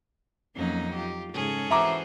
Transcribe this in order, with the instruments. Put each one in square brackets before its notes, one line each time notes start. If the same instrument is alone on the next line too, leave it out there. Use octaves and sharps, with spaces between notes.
[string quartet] F2 D#4 [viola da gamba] F#3 A#3 C#4
[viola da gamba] F4 G4
[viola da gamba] G#2 C#3 G#3 [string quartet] C#4 G#4 A4
[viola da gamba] E3 F#4 C5 [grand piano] E5 A#5 D6